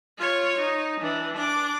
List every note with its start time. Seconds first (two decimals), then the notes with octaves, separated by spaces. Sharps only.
0.18 F4 C#5
0.57 D#4
1.01 E3 D4
1.36 D4 D6